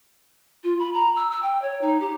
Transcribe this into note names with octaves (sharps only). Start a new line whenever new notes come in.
F4
B5
A#5
E6
E6
G5
C#5
D#4
G4